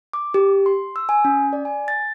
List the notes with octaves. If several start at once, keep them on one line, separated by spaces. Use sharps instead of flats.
D6
G4
C6
E6
G#5
C#4
D5
G#5
A6